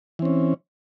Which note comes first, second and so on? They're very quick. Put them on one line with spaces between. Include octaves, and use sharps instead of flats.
E3 C4 C#4